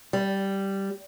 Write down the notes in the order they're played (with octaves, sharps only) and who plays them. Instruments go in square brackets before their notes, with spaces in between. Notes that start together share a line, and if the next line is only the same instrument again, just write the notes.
[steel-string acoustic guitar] G3